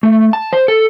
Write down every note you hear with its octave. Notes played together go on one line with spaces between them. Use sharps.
A3
A5
C5
A4